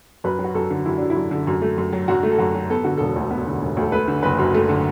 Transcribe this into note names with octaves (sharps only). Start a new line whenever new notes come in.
F#2 B4
F#3
F#4
F#2 A4
D3
F#2 E4
F#3 D4
E4
F#2
D3
F#2
A3
F#2
F#3
F#2 F#4
A3
A4
F#2 F#4
F#3
B3 A4
D3 F#4
E1 A4
D2
B3
D3
E1
D2
A4
A3 B4
D3
F#1 B4
F#2
A3
D3